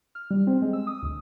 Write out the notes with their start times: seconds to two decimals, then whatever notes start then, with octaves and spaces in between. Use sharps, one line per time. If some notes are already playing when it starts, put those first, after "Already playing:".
0.15 F6
0.31 G3
0.47 C4
0.62 G#3
0.73 E6
0.87 D#6
1.02 D2